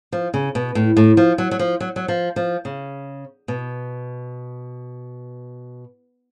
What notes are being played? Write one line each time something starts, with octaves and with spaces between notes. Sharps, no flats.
F3
C#3
B2
A2
A2
F3
F#3
F#3
F3
F#3
F#3
F3
F3
C#3
B2